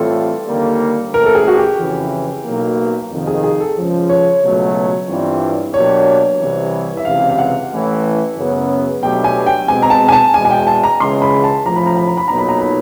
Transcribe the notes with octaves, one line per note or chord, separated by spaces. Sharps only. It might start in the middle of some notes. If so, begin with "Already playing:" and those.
Already playing: A2 E3 G3 C4 F4 A4
D#2 D3 G3 A#3
A1 A2 E3 A#4
A4
G#4
F#4
G4
F2 C#3 E3
B1 B2 F#3 A#3
F2 C3 D#3
G#4
G#4
A4
C#2 C#3 F3
C#5
C#2 B2 F#3 A3
G2 E3 G3 C4 F4
B2 F#3 A#3 D4 G4 C#5
C2 C3 E3
E5
C#2 C3 E3 F5
F5
F#5
A1 A2 E3
F#2 C#3 F#3 B3
B2 F#3 A3 D4 G4 G5
G#5
G5
B2 G#3 C4 G#5
A#5
A5
G#5
A5
E2 B2 G#3 G#5
G#5
G5
A5
A#5
C#2 C#3 E3 G#3 C6
B5
A5
A1 A2 F3 A#5
B5
A#5
B5
A#5
B5
B1 A#2 F#3 B3 D#4 A#5
B5
A#5
B5